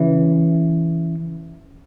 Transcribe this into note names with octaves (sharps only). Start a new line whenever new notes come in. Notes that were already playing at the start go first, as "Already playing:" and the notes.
Already playing: C#3 E3